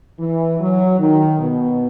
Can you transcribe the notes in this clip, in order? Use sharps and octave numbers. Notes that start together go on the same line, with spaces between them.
E3
F#3
D#3
B2